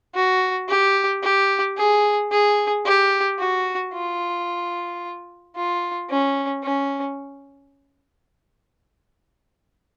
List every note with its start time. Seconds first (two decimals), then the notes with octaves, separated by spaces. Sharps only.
0.15 F#4
0.69 G4
1.23 G4
1.77 G#4
2.31 G#4
2.85 G4
3.39 F#4
3.94 F4
5.56 F4
6.10 C#4
6.64 C#4